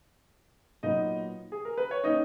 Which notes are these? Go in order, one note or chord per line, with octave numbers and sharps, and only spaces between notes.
A#2 F#3 B3 D#4 D#5
G#4
A#4
B4
C#5
D#3 A#3 C#4 D#4 D#5